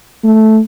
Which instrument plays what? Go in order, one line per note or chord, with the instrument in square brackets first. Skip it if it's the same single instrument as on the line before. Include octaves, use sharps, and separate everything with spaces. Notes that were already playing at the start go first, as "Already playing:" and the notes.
[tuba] A3